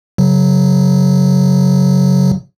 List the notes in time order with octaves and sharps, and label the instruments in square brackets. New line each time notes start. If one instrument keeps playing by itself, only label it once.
[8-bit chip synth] C#3 F#3